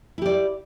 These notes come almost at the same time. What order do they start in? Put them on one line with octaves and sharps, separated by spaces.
E4 G4 D5